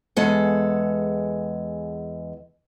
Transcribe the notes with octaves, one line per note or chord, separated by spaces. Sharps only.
E2 G#3 A4 F#5